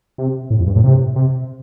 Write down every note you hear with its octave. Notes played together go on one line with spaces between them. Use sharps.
C3
A2
F2
G2
A2
C3
C3